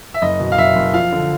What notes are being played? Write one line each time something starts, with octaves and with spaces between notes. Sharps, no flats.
E5
F#1 D#5
B2
F5
F#1 E5
F#1
F3 F5
D3